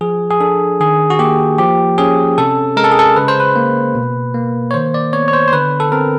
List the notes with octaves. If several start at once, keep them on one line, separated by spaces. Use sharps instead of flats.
F3 G#4
G#4
D4 A4
D#3 G#4
F#4
A#3 G4
F3 G4
C#4 G#4
C3 A4
G#3 A#4
A4
G#4
A4
C#3 B4
C5
B4
A#3
B2
A#3
C#5
D#3 C5
D5
B3 C#5
C#5
C5
C5
D3 B4
A4
C4 A#4